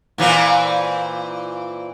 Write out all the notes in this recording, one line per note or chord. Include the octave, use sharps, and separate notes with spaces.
A#2 E3 C4